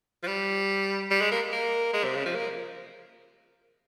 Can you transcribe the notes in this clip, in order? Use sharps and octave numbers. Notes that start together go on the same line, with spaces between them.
F3
G3
G3
G#3
A#3
A#3
G#3
C3
C#3
F3
A#3